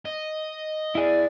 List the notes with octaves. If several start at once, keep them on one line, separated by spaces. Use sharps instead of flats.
D#5
E4 G#4 D5